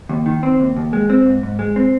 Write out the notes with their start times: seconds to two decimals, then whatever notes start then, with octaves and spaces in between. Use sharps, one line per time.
0.09 D#2
0.26 D#3
0.43 C4
0.60 D#2
0.76 D#2
0.93 G#3
1.10 C4
1.26 G#2
1.43 G#2
1.59 G#3
1.76 C4